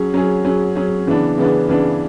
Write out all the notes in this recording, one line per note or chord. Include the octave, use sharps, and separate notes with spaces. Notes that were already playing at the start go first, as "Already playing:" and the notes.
Already playing: F#3 C#4 G#4
F#3 C#4 G#4
F#3 C#4 G#4
F#3 C#4 G#4
C#3 E3 B3 D4
C#3 E3 B3 D4
C#3 E3 B3 D4